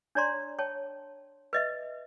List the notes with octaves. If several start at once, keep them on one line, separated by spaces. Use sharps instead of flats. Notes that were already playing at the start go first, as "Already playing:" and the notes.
D4 C#5 D5 A#5 C6
C#5 G5 A5
B4 D#5 E5